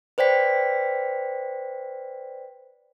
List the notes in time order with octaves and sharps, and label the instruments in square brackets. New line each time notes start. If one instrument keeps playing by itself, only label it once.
[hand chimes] B4 C5 D5 G5 B6